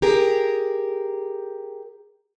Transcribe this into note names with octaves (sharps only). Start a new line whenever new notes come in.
G4 G#4 A#4